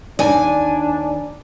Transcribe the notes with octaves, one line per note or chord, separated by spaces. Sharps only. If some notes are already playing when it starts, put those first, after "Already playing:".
D#2 D4 D5 G#5